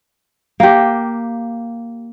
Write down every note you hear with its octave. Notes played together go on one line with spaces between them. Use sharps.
A#3 G4